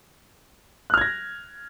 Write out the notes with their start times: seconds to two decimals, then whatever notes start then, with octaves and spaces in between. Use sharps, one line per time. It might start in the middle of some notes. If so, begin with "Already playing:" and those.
0.90 F#6
0.94 F6
0.98 G#6
1.01 A#6